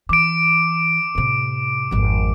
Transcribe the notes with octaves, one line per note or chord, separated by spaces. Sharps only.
E3 D6 D7
A2 C3
G#1 F2